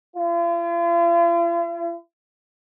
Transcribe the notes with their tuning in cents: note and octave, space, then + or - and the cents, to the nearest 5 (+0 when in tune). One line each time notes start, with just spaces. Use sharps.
F4 -45